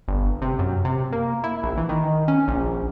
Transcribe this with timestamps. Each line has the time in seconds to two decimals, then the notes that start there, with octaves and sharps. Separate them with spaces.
0.08 G1
0.42 C3
0.59 F#2
0.85 C3
1.13 A#3
1.44 E4
1.63 A#1
1.78 E3
1.89 D#3
2.28 C#4
2.48 A#1